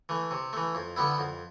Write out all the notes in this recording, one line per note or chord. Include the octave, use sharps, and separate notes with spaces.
E3 A3
C3
E3 A3
F2
D3 G3 B3 E4
F2